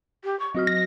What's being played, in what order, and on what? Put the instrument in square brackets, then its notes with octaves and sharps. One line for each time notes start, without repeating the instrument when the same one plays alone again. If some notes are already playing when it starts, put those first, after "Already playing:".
[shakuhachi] G4
C#6
[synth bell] F#3 F#4 F6 [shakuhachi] D#5
[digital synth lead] A#6